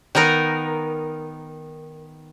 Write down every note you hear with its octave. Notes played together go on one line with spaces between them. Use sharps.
D#3 B3 D#4 A#4